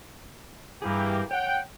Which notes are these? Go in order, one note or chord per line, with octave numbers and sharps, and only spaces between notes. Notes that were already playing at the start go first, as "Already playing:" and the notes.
G2 E3 A#3 G4 G#4
C#5 F#5 G5